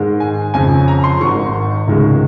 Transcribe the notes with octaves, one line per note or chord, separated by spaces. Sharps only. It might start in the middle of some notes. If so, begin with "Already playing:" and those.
Already playing: G#2 D#3 G#3
G#5
F2 C#3 F3 G#5
A#5
C6
G#1 G#2 D#3 C#6
C#2 C3 D#3 G#3